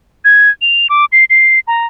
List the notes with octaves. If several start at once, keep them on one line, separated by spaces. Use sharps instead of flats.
G#6
F7
D6
C7
C7
A#5